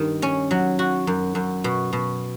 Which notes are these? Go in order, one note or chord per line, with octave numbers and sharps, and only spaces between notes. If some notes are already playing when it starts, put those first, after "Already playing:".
Already playing: G2 D#3
C#4
F#3
F#4
F#2
F#2
B2
B2